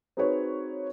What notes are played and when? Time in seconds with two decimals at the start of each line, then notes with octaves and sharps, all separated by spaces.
0.17 C4 D#4 F#4 G#4 B4 C#5